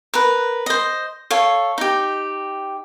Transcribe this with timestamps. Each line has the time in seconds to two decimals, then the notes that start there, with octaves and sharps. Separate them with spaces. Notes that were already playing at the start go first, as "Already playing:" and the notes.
0.14 A#4 B4
0.66 C5 D#5
1.30 A4 C#5 F5
1.78 D#4 G4